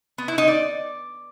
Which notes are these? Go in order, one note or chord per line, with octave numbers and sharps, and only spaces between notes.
B3
E4
D#4
D5